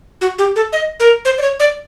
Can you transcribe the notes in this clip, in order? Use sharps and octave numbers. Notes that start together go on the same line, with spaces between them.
F#4
G4
A4
D#5
A#4
C5
D5
C#5
D5